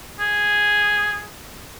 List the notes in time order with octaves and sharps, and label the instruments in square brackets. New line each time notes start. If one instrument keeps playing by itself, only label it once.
[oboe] G#4